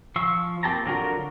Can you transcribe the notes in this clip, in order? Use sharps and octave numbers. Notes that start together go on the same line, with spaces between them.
F3 F5 C#6 E6
A#3 C4 G4 A5 A#5
D3 F#3 F4 F#4 A#4